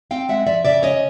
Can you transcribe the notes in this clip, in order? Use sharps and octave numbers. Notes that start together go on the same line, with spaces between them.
C4 F5 G5
G#3 E5 F#5
F3 D5 E5
C#3 D5 E5
C#4 C#5 D#5